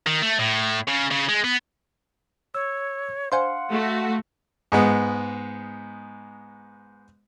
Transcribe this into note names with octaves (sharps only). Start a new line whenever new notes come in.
D#3
A3
A2
C#3
C#3
G#3
B3
C#5 E6
D4 C5 F5 F#5 G#5 C6
A3 F#4
G#2 G#3 B3